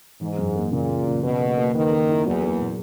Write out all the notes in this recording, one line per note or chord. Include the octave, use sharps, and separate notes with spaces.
G#2 E3
F#2
A#3
A#2 C#3
A#3
C#3
B2 B4
A#3
A#3
D#3 B4
A#3
E4
E2 F#3
A#3
A#2